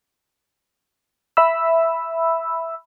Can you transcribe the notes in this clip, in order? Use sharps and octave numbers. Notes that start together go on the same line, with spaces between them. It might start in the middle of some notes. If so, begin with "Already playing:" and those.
E5 B5 E6